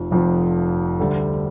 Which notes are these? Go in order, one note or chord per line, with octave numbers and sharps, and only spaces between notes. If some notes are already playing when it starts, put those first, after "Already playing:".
Already playing: F1 F2 F3
F1 F2 F3
D2 D3 G3